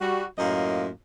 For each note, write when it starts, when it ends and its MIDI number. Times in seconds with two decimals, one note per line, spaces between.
0.01 0.26 55
0.01 0.26 66
0.39 0.89 42
0.39 0.89 45
0.39 0.89 58
0.39 0.89 65
0.39 0.89 75